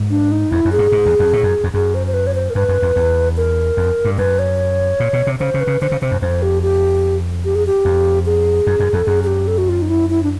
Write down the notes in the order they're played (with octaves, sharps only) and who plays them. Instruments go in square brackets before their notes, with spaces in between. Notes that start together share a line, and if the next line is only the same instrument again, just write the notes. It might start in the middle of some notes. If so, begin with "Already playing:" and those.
Already playing: [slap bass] G#2
[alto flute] D4
D#4
[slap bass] F2 [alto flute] E4
[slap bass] F#2
[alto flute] G#4
[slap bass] G2
G#2
E2
F2
A2
F#2
F2
[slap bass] F#2 [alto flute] G#4
[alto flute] C5
C5
B4
C#5
C5
A#4
[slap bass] G2 [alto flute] B4
[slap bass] F#2
F2
E2
[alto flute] A#4
[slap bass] F2
G2
[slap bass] F#2 [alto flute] B4
[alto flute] C#5
[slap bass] A#2
B2
C3
[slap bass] C#3 [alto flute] C5
[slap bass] C#3
[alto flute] B4
[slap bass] C#3
[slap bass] D3 [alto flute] C5
[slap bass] C#3
[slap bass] C3 [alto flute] C5
[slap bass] F#2
[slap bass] F2 [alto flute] C5
[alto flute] G4
G4
G4
G#4
G4
[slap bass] F2
[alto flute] G#4
[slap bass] F#2
F#2
[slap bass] F2 [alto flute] A4
[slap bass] F#2 [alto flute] G#4
[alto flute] G#4
G4
A4
F#4
F4
D#4
E4
E4
D4